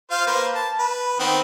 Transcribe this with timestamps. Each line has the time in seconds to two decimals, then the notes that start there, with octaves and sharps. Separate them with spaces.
0.11 F4 C5 F5
0.27 A#3 B4 C5
0.55 A5
0.79 B4
1.19 D#3 B3 C4